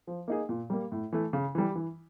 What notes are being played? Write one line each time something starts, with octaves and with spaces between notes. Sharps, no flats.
F3
A#3 D#4 G#4
A#2
G3 A#3
A2
E3 A3
C#3
E3 G3
E3